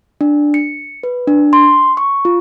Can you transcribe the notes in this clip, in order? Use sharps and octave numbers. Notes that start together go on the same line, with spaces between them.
D4
C#7
B4
D4
C6
C#6
F4